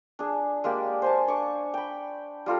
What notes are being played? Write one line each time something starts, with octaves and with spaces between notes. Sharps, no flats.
D4 G#4
G#3 A#3 G4 D5
C5 G#5 A5
D4 C#6 D6
G5 B5
G3 F4 A4 A#5